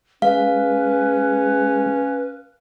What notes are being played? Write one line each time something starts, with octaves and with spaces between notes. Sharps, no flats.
G#3 C#4 B4 F5